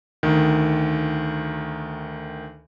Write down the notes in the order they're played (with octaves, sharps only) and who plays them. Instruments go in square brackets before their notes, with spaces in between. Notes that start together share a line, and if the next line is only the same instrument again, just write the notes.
[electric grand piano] D2 D#3